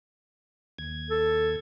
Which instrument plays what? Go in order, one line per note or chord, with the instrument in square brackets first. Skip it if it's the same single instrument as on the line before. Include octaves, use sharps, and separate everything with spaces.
[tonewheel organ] D#2 G#6
[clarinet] A4